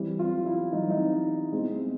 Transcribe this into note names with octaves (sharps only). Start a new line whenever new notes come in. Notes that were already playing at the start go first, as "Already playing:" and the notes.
Already playing: E3 G3 C4
F4
E4
E3 G3 C4 D#4
D#4
B2 G#3 C4